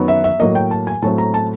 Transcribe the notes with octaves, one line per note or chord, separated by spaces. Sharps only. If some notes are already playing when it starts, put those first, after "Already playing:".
Already playing: F#2 D#3 F#3 B3
E5
E5
A2 F#3 A#3 D#5
G5
A5
G#5
A2 F#3 A3 C4 A5
A#5
A5